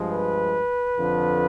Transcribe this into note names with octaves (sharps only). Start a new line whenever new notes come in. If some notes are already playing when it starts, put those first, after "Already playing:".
Already playing: G2 F3 G#3
B4
F2 D3 F3